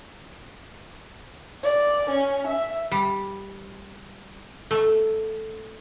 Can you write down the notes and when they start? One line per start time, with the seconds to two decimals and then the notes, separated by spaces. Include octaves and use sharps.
1.63 D5
2.10 C#4
2.48 E5
2.91 G3
4.71 A3